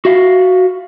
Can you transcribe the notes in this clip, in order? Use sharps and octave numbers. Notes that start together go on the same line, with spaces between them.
F#4 E5 F5